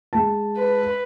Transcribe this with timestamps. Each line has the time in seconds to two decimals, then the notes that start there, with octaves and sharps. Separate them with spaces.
0.13 G#3 A5
0.57 B4